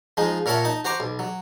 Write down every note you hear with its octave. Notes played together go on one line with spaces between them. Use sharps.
F3 G#3 D#4
A#2 A#4 C#5 E5 F#5 A5
D#4 A5
F#4 C5 A#5 D6
B1
F#3